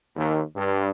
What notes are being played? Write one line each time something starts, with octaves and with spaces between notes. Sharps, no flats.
D#2
G2